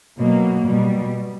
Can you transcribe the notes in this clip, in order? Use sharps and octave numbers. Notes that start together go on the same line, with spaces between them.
B2 F#3 A#3
B2 G3